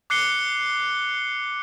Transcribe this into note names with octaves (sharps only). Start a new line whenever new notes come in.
D6 F#6 C7 C#7 G7